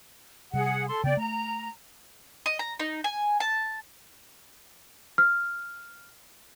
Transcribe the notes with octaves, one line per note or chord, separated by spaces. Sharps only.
C3 G3 G#4 F#5
A4 C6
C#3 B3 D5 G5
A3 A#5
D#5
A#5
D#4
G#5
A5
F6